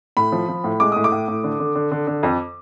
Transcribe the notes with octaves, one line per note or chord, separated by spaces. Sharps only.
A2 B5
F3
F3
A2
G#3 D6
A2 D#6
D6
A2
A2
D3
D3
D3
D3
D3
F2